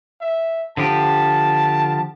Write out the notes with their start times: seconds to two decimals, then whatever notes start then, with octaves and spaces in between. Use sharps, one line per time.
0.21 E5
0.77 D3 F3 G4 A5